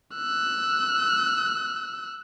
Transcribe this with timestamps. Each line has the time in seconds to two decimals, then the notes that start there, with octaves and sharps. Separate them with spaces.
0.16 E6 F#6